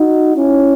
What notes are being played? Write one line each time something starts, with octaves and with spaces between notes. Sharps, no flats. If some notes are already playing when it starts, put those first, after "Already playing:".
Already playing: D#4 F#4
C#4 E4